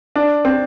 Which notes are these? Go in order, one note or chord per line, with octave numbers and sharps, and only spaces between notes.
D4
C4